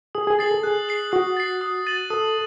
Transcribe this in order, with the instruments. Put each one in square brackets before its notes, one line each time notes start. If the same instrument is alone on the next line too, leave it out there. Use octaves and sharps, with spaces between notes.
[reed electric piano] G#4 [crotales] D#6
[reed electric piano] G#4
[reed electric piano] G#4 [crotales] A6 C7 F#7
[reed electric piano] A4
[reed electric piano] G#4 [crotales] F#6
[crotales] C7 F#7
[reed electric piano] F#4 [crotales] D#6
[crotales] A6 C7
D#6
A6 D#7 F#7
[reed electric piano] A4 [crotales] D#6